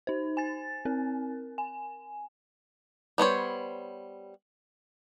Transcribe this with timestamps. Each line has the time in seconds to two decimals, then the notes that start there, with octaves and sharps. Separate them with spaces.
0.07 D#4 C5
0.37 G#5 A6
0.85 C4 A#4
1.58 G#5
3.18 G3 B3 C5 C#5